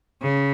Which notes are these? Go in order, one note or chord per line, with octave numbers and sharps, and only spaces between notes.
C#3